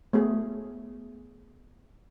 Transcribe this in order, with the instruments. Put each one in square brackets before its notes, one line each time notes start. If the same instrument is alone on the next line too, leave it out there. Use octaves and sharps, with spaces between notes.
[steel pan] A3 B3 G#4